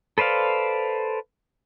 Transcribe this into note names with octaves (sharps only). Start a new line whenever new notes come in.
A4 B4 C5 D5 F5